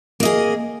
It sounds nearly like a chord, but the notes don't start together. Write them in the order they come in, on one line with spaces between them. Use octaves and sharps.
A#3 D#5 G#4